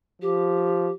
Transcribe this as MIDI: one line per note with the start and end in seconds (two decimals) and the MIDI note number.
0.22 0.90 53
0.22 0.92 67